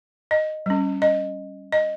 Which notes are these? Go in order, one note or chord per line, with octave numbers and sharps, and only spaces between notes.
D#5
G3 C#4
D#5
D#5